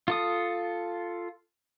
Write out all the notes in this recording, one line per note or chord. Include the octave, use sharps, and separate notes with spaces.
F4 A4 D#6